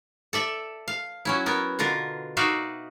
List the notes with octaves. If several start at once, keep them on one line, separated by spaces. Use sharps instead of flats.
A4 D5 E5
F5
F#3 C#4 E4
B3 A#4
B2 D3 F4 A#4
D#4 F#4 D5 E5 F5